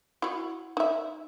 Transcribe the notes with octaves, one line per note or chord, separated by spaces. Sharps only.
E4 F#4
D#4 E5